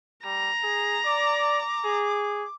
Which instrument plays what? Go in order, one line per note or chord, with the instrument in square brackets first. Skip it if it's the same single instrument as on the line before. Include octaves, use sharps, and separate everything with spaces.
[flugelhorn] G3 [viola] A#5
[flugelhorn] G#4
[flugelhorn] D5 [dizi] D6
[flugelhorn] G#4